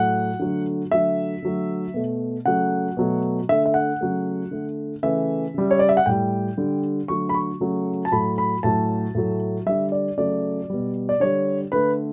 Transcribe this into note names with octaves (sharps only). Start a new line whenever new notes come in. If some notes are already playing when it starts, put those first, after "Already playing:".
Already playing: A2 F#3 A3 F#5
D3 F#3 A3
D3 F#3 A3 E5
D3 F#3 A3
B2 A3
C#3 F#3 A3 F#5
B2 F#3 A3
D3 A3 E5
E5
F#5
C#3 F#3 A3
D3 A3
C#3 E3 A3 E5
C#3 G3
C#5
D5
E5
F#5
A2 G3 G5
D3 G3
D3 F#3 A3 C#6
B5
C#6
C#3 F#3 A3
A5
A2 F#3 A3 B5
B5
A2 F#3 A3 A5
A2 F#3 A3
D3 G3 E5
D5
C#3 F#3 A3 D5
B2 G3
D5
D3 G3 C#5
D3 A3 B4